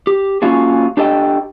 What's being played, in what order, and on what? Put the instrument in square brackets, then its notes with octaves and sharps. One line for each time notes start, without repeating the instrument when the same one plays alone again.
[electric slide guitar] G4
A#3 C#4 F4 F#4 G#4
D4 G4 A4 D#5 G5